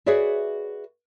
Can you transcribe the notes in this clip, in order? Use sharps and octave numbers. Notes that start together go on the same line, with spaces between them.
F#4 G#4 B4 C#5 D5 E5